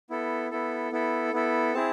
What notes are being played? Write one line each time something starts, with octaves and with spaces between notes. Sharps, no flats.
B3 E4 A4
B3 E4 A4
B3 E4 A4
B3 E4 A4
C4 E4 G#4 A5